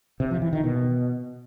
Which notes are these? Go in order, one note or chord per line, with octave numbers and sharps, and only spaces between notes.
C3
F3
E3
D#3
B2